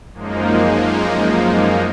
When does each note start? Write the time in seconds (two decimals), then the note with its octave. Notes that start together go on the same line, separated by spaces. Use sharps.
0.13 F#2 F3 G#3 A#3 D#4